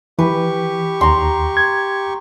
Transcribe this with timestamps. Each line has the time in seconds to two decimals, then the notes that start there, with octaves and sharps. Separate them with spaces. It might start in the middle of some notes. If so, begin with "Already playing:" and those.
0.19 E3 G4 B4 C#6
1.01 D#2 A#5 C6
1.57 G#6